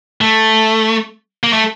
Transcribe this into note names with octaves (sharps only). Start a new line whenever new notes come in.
A3
A#3
A3